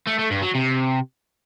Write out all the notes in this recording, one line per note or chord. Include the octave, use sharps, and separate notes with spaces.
A3
A3
G2
F#3
C3